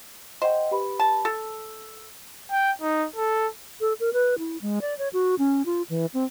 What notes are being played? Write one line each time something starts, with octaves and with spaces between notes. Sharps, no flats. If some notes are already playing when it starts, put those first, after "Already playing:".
C5 D#5 F#5 G5
G4 B4 B5
A5
A4 E6
G5
D#4
A4
A4
A#4
B4
E4
G#3
D5
C#5
F#4
C#4
F4
E3
C4